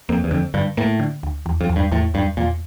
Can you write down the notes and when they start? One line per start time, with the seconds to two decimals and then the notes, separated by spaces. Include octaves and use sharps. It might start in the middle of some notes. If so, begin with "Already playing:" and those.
0.09 F2 A#3
0.24 E2
0.31 F2 D3
0.54 G2 D3
0.77 A2 A#3
1.00 D3
1.23 D2
1.46 E2
1.61 F2
1.69 E2
1.76 G2
1.92 E2 A2
2.14 E2 G2
2.37 E2 A#2